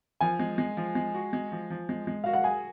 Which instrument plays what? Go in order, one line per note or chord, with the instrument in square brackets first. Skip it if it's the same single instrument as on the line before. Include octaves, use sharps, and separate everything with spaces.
[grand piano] F3 [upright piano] G#5
[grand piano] G#3
G#3
F3
G#3
F#4
G#3
F3
F3
G#3
G#3
[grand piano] F#4 [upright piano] F5
[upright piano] F#5
[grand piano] G#4 [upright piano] G#5